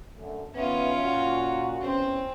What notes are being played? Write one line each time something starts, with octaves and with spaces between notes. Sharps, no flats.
F#2 D3 A3
E2 D#3 B3 C#4 F4 E5
A#2 F#4
E2 C4 C#4